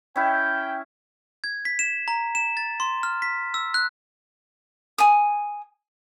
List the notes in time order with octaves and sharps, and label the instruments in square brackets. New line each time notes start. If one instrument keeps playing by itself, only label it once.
[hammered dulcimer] C#4 E4 [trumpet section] G5
[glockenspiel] G#6
B6
E7
A#5
E7
A6
C6
F6
B6
E6
F#6
[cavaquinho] G#5 D#6